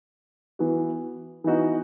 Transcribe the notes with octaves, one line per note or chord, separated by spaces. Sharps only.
E3 B3 F#4
E3 B3 D#4 F#4